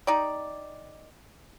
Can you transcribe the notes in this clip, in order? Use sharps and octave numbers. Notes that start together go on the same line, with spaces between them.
D#4 G4 D5